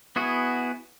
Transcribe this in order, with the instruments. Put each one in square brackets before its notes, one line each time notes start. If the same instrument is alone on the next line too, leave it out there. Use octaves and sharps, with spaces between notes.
[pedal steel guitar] B3 E4 F#4 G#4